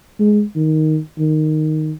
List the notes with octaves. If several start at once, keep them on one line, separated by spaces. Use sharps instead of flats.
G#3
D#3
D#3